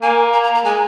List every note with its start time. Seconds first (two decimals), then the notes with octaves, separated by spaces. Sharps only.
0.02 A#3 G#5
0.33 A#5
0.44 A#5
0.55 A#5
0.65 G#3 G#5